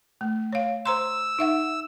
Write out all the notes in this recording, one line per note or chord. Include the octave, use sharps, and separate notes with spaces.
A3
C#5 F5
C5 A#5 C6 E6
D#4 E5 F#5